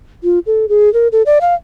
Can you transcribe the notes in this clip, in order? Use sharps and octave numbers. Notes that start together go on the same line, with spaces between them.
F4
A4
G#4
A#4
A4
D5
F5